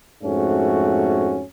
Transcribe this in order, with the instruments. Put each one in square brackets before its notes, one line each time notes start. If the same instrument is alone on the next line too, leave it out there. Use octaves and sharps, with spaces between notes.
[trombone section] F2 G#2 A3 C#4 F#4